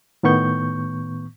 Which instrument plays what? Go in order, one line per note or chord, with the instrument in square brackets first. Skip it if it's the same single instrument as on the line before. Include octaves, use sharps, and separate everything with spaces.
[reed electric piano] A2 D#3 B3 C#6 G6